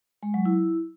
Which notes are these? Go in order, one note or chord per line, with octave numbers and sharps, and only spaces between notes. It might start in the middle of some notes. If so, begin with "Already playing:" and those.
G#3
F#3
E4